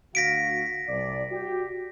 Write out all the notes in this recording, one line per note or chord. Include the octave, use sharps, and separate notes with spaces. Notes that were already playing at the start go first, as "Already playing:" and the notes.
D2 F#4 F5 A#6 B6 D7
C2 D5
F#4 G4